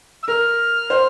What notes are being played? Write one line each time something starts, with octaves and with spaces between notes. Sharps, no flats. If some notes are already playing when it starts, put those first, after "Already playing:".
E6
A#4 F6
C5